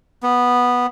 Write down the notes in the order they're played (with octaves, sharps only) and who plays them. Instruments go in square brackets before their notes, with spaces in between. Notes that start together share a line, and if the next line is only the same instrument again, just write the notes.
[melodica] B3